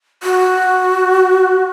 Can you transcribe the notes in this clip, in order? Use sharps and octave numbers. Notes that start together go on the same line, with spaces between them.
F#4